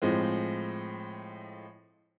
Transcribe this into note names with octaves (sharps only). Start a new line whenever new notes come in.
A2 F3 G#3 C4